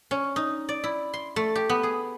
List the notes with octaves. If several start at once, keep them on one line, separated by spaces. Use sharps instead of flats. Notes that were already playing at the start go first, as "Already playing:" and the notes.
C#4
D#4
D5
E4
C6
A3
G4
B3
G#4